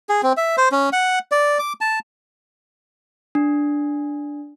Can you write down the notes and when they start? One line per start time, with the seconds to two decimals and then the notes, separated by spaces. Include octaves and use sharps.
0.09 G#4
0.23 C4
0.37 E5
0.57 C5
0.72 C#4
0.93 F#5
1.32 D5
1.59 D6
1.81 A5
3.35 D4